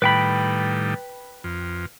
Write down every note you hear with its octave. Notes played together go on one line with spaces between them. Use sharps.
A2 D#3 G3 B4 G5 B5
F2